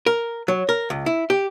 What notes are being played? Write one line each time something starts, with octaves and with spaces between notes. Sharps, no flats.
A#4
F#3
A#4
C#2
E4
G4